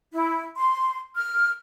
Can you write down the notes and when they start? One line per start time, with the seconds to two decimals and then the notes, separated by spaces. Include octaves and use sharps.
0.13 E4
0.57 C6
1.16 F6